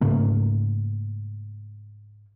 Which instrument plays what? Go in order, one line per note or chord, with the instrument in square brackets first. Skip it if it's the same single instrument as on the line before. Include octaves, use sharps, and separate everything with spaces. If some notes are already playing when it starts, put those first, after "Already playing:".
[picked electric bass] G#2 C#3 A3 A#3